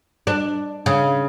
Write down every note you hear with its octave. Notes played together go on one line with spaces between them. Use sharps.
D4
C#3